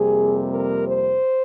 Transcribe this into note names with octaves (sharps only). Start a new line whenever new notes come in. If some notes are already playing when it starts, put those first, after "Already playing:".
Already playing: F2 C3 G3 A#3 G#4
A#4
C5